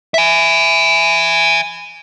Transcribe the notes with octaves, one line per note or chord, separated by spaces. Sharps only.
E5 G#5